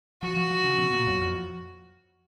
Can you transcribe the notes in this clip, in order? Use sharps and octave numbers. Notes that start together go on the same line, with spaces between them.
F3 F#4
F3
F3
C#3
B2
A#2
F#2
F2